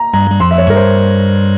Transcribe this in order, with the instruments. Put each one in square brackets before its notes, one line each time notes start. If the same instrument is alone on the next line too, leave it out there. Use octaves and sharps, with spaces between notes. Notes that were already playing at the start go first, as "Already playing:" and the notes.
Already playing: [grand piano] A#5
[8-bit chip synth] G2 G3 [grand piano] A#5
[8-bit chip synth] G3
[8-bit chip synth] F2 F3 [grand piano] C6
[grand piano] E5
C#5
[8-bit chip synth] G2 G3 [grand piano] A#4
[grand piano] C5